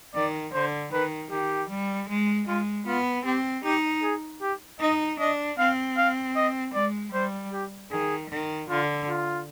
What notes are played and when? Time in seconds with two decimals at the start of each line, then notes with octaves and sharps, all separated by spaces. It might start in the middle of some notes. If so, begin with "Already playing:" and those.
0.15 D#3 D5
0.53 D3 C5
0.92 D#3 B4
1.31 D#3 G4
1.70 G3
2.09 G#3
2.47 G#3 F4
2.87 B3 F4
3.25 C4 G4
3.64 D#4 G4
4.03 G#4
4.42 G4
4.80 D#4 D#5
5.19 D4 D#5
5.58 C4 F5
5.97 F5
6.36 D#5
6.74 G#3 D5
7.13 G3 C5
7.53 G4
7.91 D#3 G#4
8.30 D#3
8.69 D3 F4
9.08 F4